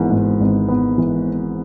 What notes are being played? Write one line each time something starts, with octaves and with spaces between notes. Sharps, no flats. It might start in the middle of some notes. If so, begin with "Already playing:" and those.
Already playing: G#1 G#2 E3 B3
G#2
G#1
B3
E3